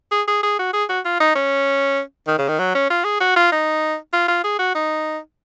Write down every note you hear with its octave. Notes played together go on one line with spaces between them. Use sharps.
G#4
G#4
G#4
F#4
G#4
F#4
F4
D#4
C#4
D#3
C#3
D#3
F#3
C#4
F4
G#4
F#4
F4
D#4
F4
F4
G#4
F#4
D#4